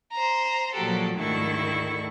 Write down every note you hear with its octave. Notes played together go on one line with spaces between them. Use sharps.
C5 A#5
A#2 F3 F#3 F#4 G4 A4
D2 G#2 D#3 E4 A4 C#6